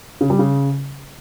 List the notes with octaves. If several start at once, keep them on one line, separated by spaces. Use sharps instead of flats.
C#3
G3
C#3